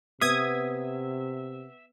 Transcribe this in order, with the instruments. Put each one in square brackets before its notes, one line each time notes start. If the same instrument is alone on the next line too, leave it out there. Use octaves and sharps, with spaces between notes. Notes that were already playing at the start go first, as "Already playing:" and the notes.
[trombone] C3 [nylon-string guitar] B3 [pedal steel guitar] E5 [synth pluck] D#6 G#6